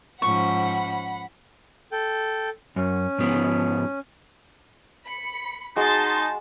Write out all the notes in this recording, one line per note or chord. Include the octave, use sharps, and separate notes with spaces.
G#2 F3 C#4 F#5 B5 C#6
A4 G5
F#2 C#4
G#2 F3 B3
B5 C#7
G#3 D#4 F#4 A5 C6 A6